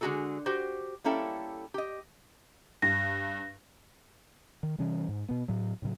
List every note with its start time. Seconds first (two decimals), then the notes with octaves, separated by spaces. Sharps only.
0.01 D3 G#3 F4 F#4 G#4 A4
0.46 F#4 G4 C5
1.04 G3 A#3 C#4 E4 A4 G5
1.74 G4 D#5
2.82 G2 A#6
4.63 D#3
4.78 C3 E3 G3 C#4
5.09 G#2
5.29 B2 B3
5.48 A2 F#3
5.82 A2 C#3 E3 F#3